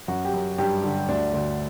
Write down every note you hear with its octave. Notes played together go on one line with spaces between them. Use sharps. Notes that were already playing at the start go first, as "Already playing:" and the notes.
F#2 F#4
G4
F#2
G2 G4
D3
D2 D4
D2